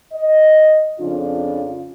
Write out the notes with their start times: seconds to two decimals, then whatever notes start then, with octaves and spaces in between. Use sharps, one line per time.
0.13 D#5
0.99 F2 C#3 D4 F4